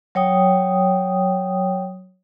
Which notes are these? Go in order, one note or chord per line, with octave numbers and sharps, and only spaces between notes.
F#3 C#5 G5 D#6